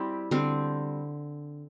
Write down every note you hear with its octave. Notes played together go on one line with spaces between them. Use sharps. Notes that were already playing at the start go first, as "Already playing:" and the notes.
Already playing: G3 C4 E4 G4
D3 G3 C4